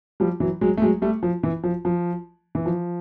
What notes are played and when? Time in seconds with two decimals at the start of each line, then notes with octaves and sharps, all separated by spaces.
0.20 F3 G3
0.40 E3 F#3
0.61 F#3 G#3
0.77 A3
0.82 F#3 G#3
1.02 G3 A3
1.23 F3
1.43 E3
1.63 F3
1.85 F3
2.55 E3
2.66 F3